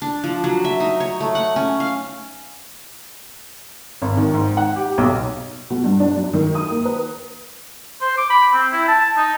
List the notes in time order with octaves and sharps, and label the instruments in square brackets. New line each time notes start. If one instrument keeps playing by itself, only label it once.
[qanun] D4
F3
F#3
E5
D#4
C#5
A3
F#5
C#4
F5
[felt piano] G#1
D#3
G#2
F#5
G4
B1
[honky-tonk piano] B2
G2
D4
F#2
D#3
D#6
A#3
B4
[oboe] C5
D6
B5
C4
E4
A5
D#4